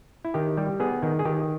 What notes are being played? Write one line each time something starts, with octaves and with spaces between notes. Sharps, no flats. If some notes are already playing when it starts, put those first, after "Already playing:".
E4
D#3 G4
G3
B3 G#4
D#3
G#4
D#3 G4